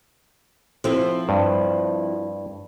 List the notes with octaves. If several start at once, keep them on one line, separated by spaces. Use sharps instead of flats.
F3 C4 E4
G2